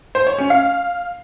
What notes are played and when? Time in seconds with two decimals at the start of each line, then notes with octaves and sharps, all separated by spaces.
0.15 C5
0.27 C#5
0.38 C#4
0.50 F5